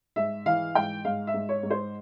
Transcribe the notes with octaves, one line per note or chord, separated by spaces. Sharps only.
G#2 E5
E3 F5
G#2 G5
G#2 F5
E5
G#2
C#5
G#2
C5